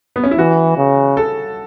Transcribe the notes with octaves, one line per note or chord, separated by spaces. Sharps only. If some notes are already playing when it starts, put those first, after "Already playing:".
B3
C#4
E4
E3 F#4
C#3
A4